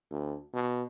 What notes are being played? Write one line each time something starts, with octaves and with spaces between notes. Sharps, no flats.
D2
B2